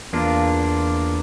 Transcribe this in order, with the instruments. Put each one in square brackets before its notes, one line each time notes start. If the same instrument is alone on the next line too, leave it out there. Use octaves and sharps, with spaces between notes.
[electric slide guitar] E2 A#3 D4 F4